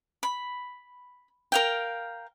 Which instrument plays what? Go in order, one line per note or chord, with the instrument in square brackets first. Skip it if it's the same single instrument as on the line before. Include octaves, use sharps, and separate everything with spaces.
[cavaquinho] B5
A#4 F5 G5